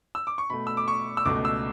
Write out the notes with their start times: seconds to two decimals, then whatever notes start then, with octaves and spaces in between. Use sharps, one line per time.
0.15 E6
0.27 D6
0.38 C#6
0.50 B2 A3 B5
0.67 E6
0.77 D6
0.88 C#6
1.17 E6
1.25 C#2 B2 A3 D6
1.45 E6